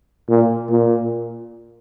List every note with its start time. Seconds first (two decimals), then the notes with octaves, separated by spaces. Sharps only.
0.29 A#2
0.70 A#2